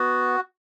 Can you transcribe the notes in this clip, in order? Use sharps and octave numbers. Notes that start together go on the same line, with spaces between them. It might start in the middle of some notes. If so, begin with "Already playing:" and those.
Already playing: B3 F#4